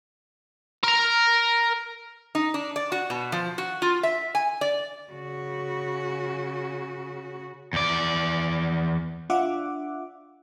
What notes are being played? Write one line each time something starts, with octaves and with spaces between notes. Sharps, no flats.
A#4 A#5
D#4
D4
D5
F#4
B2
F3
F#4
F4
E5
G#5
D5
C#3 F#4
E2 D5
D4 F4 E5 F#5 D6